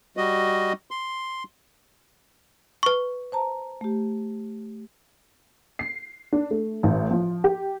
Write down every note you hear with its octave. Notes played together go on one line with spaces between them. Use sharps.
G3 F#4 D#5
C6
B4 C#6
C5 A5 A#5
A3 G4
C7
D4
A3
A1
F3
G4